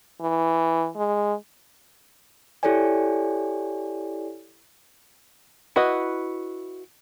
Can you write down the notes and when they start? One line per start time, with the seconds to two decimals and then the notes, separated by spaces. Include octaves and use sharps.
0.21 E3
0.96 G#3
2.63 E4 G4 A4 C#5 D5 G#5
5.76 E4 F#4 B4 D#5